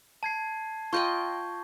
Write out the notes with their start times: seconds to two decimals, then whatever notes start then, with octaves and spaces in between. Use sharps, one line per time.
0.23 A5 G#6 C7
0.93 F4 D#5 G5 C#6 G6